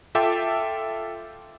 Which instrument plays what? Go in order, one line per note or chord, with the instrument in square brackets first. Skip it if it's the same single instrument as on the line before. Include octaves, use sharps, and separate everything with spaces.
[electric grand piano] F4 A4 E5 G5 D6